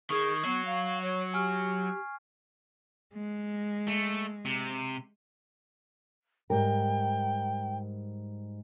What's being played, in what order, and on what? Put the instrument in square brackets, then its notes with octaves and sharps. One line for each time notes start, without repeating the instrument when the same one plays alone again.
[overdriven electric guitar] D#3 [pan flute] G#4 [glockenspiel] C#6 G#6 C7
[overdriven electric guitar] F#3 F#4 [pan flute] B3 [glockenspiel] C7
[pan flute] F5
C#5
[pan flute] G4 [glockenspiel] G#5 F6
[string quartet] G#3
[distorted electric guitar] A3
C3
[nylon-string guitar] G#2 G3 A#4 [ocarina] G5